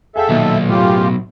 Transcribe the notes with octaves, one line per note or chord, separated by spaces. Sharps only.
G#4 A4 E5 F5 G5
B1 A#2 D#3
F#2 A2 F4 G4